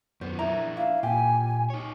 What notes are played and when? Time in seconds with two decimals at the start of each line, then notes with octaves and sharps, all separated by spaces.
0.21 F#2 B3 C5
0.39 D4 E4 A#4 A#5
0.77 E4 F5
1.03 A#2 G4 G#5
1.70 D#4 C#5